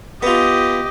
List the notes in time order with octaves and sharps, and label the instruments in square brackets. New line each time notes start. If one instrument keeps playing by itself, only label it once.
[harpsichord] B3 F4 [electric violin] G4 [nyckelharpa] D#5